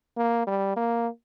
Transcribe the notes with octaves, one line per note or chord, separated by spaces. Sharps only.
A#3
G3
A#3